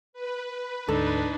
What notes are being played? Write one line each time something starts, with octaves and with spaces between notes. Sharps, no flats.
B4
D2 G#2 D4 D#4 A4